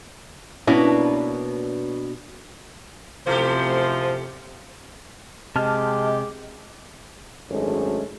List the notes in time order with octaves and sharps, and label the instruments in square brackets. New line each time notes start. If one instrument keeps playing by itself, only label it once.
[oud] B2 A#3 D4 [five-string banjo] B3 C#4 E4
[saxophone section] F#2 A2 C5 [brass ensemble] C3 [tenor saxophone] F3 [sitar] A3 G4
[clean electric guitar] C3 [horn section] G#3 G4 [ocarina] D#5 [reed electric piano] A5 F6
[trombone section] G#1 F#2 G#3 A3 C#4 D4